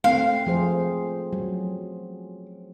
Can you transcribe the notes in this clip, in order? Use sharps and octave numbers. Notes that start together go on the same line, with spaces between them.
A3 C4 F5
F3 G#4 C5
F#3